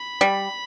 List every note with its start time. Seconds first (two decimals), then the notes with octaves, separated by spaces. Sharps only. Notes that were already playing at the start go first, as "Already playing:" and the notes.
Already playing: B5
0.21 G3